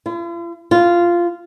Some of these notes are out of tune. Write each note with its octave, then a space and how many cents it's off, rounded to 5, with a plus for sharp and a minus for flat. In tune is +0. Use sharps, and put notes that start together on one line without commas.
F4 -45
F4 -10